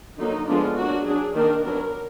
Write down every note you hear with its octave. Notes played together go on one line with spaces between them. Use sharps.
D3 F#3 A#3 D#4
D3 F3 G#3 B3 D4 F4
F#3 A#3 D4 F#4
F#3 D4 G#4
D#3 A#3 D4 A#4
F#3 B3 D4 A#4